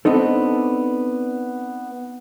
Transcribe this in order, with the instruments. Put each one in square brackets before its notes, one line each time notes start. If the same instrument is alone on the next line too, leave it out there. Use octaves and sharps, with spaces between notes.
[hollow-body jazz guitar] B3 C4 D4 D#4 A4